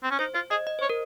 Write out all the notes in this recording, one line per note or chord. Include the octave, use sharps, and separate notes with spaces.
C4
C#4
D#4 C5
F4 C5
G#4 D#5
D#5
C5 C#5
A#4